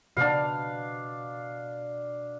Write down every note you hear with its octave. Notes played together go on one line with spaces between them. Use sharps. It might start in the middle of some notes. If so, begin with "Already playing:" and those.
B2 D4 F5